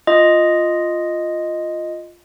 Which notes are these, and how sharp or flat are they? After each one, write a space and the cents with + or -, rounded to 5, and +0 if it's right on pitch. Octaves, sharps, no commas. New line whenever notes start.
F4 +0 D#5 +0